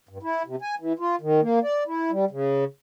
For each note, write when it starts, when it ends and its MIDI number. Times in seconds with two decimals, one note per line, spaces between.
0.09 0.18 43
0.23 0.43 64
0.46 0.56 48
0.62 0.75 80
0.79 0.93 52
0.99 1.16 65
1.21 1.41 51
1.41 1.59 58
1.63 1.84 74
1.86 2.11 64
2.11 2.25 55
2.31 2.64 49